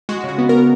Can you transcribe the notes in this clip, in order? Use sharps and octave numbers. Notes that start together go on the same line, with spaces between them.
G#3 F#4
C#3 F#4
B3
A#4